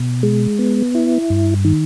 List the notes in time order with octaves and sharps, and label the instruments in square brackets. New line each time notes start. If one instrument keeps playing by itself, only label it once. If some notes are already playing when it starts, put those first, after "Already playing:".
Already playing: [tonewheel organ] B2
G#3
B3
E4
G2
D#3